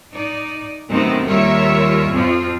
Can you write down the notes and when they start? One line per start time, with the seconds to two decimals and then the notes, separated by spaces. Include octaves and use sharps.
0.13 D#4 D5
0.90 F#2 C3 D#3 A3 B3 C4
1.27 D#2 G3 F4 A#4 C#5 E5
2.12 F2 F3 C4 F4